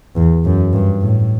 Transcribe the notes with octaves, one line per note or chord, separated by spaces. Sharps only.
E2
F#2
G2
A2